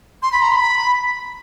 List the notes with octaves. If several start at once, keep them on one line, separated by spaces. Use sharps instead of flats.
C6
B5
A#5
C6
B5